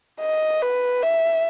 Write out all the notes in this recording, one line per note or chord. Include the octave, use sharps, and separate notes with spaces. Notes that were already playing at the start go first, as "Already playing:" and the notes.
D#5
B4
E5